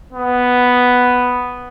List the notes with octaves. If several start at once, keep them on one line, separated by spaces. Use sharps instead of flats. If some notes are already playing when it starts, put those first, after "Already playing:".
B3